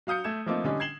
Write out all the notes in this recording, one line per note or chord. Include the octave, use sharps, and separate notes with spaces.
F#3 F5 D#6 G6 C#7
A3 G#6 E7
F3 A3 A#3 C4 D#4 F4
D3 G3 C#4 D#4
G#6 C7 E7 F#7 G7